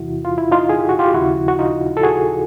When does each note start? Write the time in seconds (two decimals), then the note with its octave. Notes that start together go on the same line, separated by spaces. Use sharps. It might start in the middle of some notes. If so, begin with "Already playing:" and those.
Already playing: E2 C3 E3 E4 F#4
0.25 F4
0.38 E4
0.52 D#4 F4
0.69 G#4
0.79 G4
0.89 F#4
0.99 F4 G4
1.14 D#2 C#3 F3 E4 F#4
1.48 F#4
1.59 D#4 F4
1.97 A4
2.03 F#4 G#4